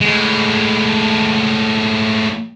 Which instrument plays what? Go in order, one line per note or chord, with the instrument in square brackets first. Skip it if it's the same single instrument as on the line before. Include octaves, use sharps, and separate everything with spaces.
[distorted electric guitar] A2 G#3